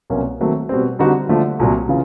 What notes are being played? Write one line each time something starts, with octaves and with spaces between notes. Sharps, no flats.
C2 B2 F#3 A#3 C#4
D#3 F#3 A3 C4
B2 G3 C4
D3 G3 C4 D#4 F#4
D3 F3 A3
C2 A#2 F#3
C#3 E3 F4